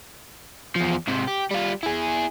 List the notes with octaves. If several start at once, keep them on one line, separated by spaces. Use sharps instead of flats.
E2 F3
G#2 C3
G4
G3 F4
E4 G#4